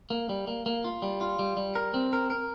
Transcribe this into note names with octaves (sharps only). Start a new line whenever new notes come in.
A#3
G3
A#3
A#3
F4
G3
F4
G3
G3
A#4
C4
A#4
A#4